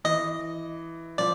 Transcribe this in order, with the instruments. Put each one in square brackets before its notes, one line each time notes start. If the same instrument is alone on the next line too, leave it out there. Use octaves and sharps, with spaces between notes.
[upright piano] E3 [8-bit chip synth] D#5
[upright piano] F3 [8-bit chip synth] D5